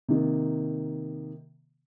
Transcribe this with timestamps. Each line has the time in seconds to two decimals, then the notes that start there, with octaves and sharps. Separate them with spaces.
0.08 C3 D#3 A#3